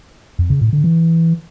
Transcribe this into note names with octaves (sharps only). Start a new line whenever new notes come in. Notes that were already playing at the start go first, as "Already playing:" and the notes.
F2
C#3
A2
D3
E3